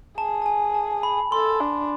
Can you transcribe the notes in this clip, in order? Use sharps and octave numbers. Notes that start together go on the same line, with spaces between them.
G#4 A5
A5
G#5
A5
B5
A4 C6
D4